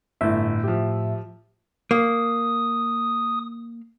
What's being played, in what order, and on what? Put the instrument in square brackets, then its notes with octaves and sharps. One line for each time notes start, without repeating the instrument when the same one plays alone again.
[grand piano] G1 [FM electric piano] A2 E5
[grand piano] F3 G4
[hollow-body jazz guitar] A#3 [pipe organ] D#6